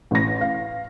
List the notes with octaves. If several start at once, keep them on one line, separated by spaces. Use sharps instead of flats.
A1 A#6
F5